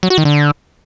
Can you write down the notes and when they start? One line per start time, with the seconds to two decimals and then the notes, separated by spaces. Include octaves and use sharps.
0.03 F#3
0.10 F#4
0.18 D#3
0.25 D3